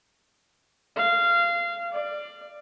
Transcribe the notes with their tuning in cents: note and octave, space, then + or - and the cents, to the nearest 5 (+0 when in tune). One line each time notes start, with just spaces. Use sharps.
F5 -20
D5 +15